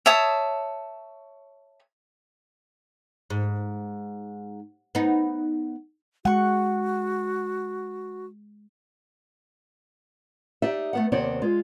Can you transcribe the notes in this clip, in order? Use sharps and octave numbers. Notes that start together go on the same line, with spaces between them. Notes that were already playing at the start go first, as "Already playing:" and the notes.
C#5 E5 A5 D#6
G#2
B3 D#4
G#3 F#4 F#5 C#6
D#4 G4 D5 E5
A3 B3 F#5
D#2 C3 B3 C4 C#5 D5
G#3 F4